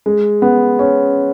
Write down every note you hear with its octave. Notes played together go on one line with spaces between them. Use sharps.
G#3
B3
C#4